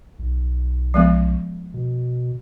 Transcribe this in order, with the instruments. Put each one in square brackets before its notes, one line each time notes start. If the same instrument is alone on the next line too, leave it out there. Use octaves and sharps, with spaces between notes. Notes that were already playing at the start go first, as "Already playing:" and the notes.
[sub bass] B1
[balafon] F3 G#3 B3
[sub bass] B2